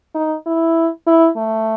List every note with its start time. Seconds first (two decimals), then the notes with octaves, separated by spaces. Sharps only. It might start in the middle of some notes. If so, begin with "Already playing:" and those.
0.15 D#4
0.46 E4
1.07 E4
1.37 A3